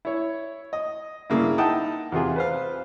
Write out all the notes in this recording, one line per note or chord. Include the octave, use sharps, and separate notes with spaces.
E4 C#5
D#5
G2 C#3 A#3 E4
D#4 E4 F#5 G5 A5 D#6
E2 C3 F4 G#4
B4 C5 F5